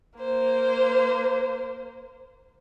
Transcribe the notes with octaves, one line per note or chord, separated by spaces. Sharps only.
A#3 C5